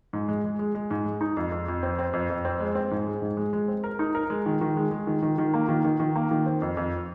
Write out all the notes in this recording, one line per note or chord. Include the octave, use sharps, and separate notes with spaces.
G#2
G#3
G#3
G#3
G#3
G#2
G#3
D#4
F2
F2
F2
C4
C4
F2
F2
C4
G#3
C4
G#2
G#3
G#2
G#3
G#3
C4
A#4
D#4
A#4
G#3
D#3
D#3
G#3
G#3
D#3
D#3
D#3
A#3
D#3
D#3
D#3
A#3
D#3
C4
F2
F2